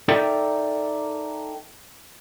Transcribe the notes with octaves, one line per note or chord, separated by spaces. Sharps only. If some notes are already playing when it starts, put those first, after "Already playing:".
D#4 A4 A#4 D5 E5 G5